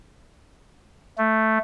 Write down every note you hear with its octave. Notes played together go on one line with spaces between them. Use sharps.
A3